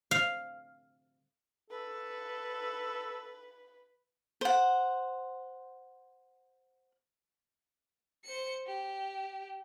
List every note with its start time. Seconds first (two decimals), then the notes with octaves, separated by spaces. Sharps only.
0.11 F5
1.70 A4 B4
4.41 C5 F#5
8.24 C5 C#7
8.67 G4